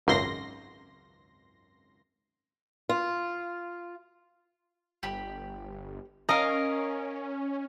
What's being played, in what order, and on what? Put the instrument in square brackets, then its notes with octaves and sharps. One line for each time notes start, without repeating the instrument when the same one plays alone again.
[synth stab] G#1 C#2 F#2 C6 A#6
[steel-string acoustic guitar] F4
[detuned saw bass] G1 [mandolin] G4 B5
[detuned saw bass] C#4 [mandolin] A#4 F5 [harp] D#5